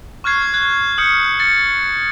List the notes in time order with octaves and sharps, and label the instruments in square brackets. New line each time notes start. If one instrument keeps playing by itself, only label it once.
[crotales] C#6 F6 F#6 G#6 C7
F#6 G#6
D#6 F6 G6 C#7
A6 C#7